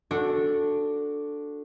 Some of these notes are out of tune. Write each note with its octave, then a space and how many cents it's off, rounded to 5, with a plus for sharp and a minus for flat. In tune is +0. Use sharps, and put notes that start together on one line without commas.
D4 +0 F#4 -15 A4 +5